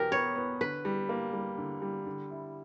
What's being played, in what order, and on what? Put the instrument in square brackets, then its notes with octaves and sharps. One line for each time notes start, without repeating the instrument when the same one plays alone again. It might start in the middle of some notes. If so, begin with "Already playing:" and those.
Already playing: [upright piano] E2 B2 F#3 [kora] G4 A#4
[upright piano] B3 [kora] C#5
[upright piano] B3
[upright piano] D3 [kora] B4
[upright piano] G3
A#3
G3
D3
G3
D3
E4